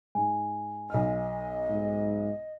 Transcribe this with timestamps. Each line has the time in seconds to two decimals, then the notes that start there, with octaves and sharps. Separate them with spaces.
0.15 G#2 G#5
0.90 B1 D#5 F6
1.69 G#2